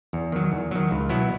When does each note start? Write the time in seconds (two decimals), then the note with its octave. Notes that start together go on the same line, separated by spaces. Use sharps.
0.13 E2
0.32 D#3 F#3
0.52 E2
0.71 D#3 F#3
0.91 C#2
1.09 B2 F#3 B3 E4